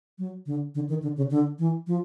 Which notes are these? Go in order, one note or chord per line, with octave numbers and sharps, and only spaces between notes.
F#3
D3
D3
D#3
D3
C#3
D3
E3
F3